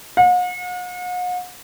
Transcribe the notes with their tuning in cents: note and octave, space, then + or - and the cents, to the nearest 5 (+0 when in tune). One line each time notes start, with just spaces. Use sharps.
F#5 -45